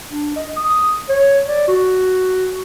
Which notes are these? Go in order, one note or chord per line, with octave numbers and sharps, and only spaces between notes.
D4
D#5
D#6
C#5
D5
F#4